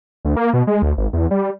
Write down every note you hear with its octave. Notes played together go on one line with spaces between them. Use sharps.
D2
A#3
B2
G#3
D2
G#1
E2
G3